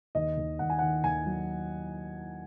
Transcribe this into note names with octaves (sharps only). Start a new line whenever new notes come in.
D#2 D#5
D#2
D#2 F#5
G#5
D#3 F#5
D#2 G#5
F#3